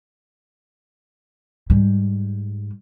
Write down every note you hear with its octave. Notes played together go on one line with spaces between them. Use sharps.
G#2 G3